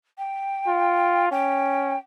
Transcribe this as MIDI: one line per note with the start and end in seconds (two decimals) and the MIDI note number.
0.18 1.26 79
0.67 1.29 65
1.32 1.95 61
1.32 1.98 79